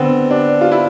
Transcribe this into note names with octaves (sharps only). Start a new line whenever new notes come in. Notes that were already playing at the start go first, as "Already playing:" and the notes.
Already playing: D3 B3 C4
D4
F4
E4